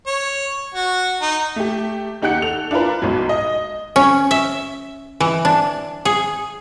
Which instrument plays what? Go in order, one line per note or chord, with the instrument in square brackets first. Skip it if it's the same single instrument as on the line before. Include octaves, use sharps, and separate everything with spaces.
[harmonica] C#5
F#4
D#4
[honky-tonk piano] A3 G4
D#2 D#4 G4 F#5 F#6 C#7
A4 F7
D4 E4 F4 A#4 B4
B1 G#2 F#3
D#5
[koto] C#4
E5
E3
D4
G#4